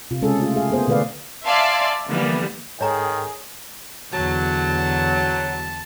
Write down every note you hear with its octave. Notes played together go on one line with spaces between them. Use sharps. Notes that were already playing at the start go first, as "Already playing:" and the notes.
C3 F4
C#3 G#3 C#4 G#4 A4
A3 F4
G#4 F5
A#3 B3 G#4 C5
B2 D3 A3 B4 D5 F5
D5 E5 F5 G#5 A5 C6
D3 E3 F3 G3 A#3 B3
G#2 D#3 G#4 A4 C#5 G5 A#5
E2 D3 F#3 A5